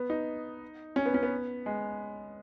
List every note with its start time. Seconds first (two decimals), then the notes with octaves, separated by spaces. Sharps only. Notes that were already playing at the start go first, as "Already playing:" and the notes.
Already playing: B3
0.10 D#4
0.96 C#4
1.06 B3
1.14 C#4
1.23 B3
1.66 G#3